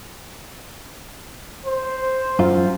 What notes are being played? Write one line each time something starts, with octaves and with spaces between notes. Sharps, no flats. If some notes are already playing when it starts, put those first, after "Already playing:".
C5
F#2 F4